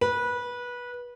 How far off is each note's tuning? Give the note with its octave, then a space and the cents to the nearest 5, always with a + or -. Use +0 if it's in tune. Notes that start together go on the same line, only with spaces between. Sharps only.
B4 -20